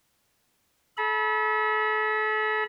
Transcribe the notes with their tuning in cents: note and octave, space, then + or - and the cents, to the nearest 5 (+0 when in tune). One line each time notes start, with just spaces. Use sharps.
A4 -35 B5 -30